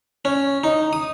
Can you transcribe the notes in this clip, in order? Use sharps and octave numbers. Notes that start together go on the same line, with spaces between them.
C#4
D#4
D#6